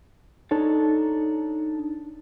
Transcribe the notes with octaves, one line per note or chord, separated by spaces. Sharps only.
D4 D#4 A4 C#5